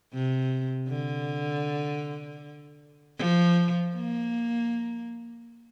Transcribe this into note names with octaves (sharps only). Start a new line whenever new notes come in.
C3
D3
F3
A#3